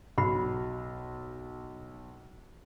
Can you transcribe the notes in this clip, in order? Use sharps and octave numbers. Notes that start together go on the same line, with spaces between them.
B1 F#4 B5